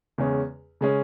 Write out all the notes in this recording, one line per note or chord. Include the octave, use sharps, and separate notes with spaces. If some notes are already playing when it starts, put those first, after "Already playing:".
E2 C#3 G#3 C#4
C#3 G#3 C#4